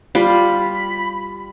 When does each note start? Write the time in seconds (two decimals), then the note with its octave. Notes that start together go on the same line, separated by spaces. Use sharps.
0.15 G3 F4 B5